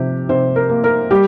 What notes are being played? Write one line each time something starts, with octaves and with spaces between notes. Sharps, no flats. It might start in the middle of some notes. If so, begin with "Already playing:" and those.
Already playing: C3 F3 G4
C3 C5
A#4
A#3
A#4
G3 G4